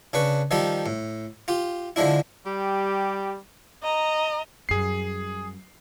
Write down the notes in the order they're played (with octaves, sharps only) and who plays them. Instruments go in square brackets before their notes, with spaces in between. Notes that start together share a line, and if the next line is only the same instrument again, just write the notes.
[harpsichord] C#3 D4 B4 C#6
D#3 F3 G3 G4 A4
A2
F4 G4
D3 F3 G#3 D4 E4
[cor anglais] G3 [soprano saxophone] G4
[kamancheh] D#5 A#5
[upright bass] F#2 G3 [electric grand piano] G#4 C7